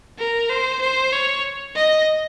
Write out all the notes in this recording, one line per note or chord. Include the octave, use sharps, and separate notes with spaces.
A#4
C5
C5
C#5
D#5